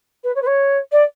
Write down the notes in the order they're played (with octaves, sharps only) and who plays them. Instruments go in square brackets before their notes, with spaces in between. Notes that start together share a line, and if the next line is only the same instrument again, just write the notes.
[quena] B4
C#5
B4
C#5
D5